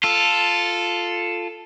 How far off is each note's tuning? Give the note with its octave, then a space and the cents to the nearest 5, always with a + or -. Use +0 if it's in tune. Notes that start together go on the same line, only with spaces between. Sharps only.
F4 +0 A4 +0